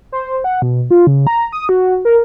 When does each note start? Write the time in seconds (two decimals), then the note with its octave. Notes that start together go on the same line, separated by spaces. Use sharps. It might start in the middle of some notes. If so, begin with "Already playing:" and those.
0.12 C5
0.44 F#5
0.62 B2
0.91 F4
1.07 C#3
1.27 A#5
1.52 D#6
1.69 F#4
2.05 A#4